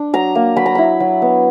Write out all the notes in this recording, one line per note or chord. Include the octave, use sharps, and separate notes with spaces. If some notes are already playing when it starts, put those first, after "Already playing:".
Already playing: D4
F#3 A#5
A#3
F#3 B5
A#5
E4 B5
F#3
B3